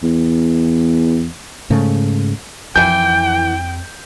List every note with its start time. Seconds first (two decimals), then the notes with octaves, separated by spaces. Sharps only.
0.03 E2
1.70 G#2 C#3 A3
2.76 F2 E3 G5 G#5 G6